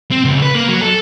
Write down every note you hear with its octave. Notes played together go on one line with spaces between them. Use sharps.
C4
C#2
B4
A#3
F#3
A4